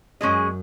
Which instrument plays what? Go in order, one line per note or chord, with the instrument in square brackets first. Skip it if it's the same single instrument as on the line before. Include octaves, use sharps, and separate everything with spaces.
[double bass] F#2 [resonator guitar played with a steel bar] G#3 C#4 G#4 D#5